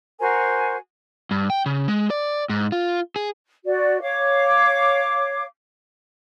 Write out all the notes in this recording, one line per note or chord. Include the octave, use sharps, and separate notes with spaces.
F#4 A#4 C5 G#5
G2
G5
C#3
G#3
D5
G#2
F4
G#4
F#4 D5
C#5 F5 D6